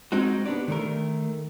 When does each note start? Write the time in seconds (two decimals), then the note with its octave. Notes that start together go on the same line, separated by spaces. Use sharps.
0.12 G#3 C4 D#4 F#4
0.46 B3 D4 G4 D5
0.68 D#3 A3 A#4